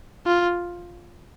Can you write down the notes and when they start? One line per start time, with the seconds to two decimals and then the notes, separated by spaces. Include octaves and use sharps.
0.26 F4